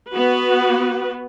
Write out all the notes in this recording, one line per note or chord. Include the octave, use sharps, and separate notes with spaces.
B3 F#4 B4